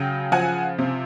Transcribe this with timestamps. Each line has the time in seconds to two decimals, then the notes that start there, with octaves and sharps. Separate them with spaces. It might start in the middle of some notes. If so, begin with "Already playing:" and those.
Already playing: C#3 F#3 G5
0.32 F3 F#5 G#5
0.78 C3